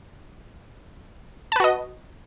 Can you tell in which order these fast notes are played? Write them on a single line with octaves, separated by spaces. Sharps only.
A5 B4 F#4 D#5